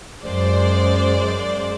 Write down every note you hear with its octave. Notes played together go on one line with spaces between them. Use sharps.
F#2 G#3 C5 D5